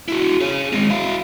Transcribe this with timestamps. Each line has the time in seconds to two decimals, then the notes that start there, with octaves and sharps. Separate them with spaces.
0.08 E4 F#4
0.41 G#4 C#5
0.73 G#3 C4
0.90 E4 F5